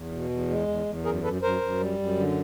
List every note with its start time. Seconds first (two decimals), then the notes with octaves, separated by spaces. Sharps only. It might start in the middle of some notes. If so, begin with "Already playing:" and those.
Already playing: E2
0.11 B2
0.30 E2
0.49 G#3
0.67 E2
0.86 E2
1.05 F#2 G#4 A#4
1.23 F#2 A4 B4
1.42 F#2 A#4 C5
1.61 F#2
1.80 G3
1.99 F#2
2.17 D3